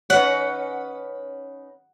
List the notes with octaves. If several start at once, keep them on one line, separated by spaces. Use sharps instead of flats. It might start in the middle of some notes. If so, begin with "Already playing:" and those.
C#4 D#4 B4 F#5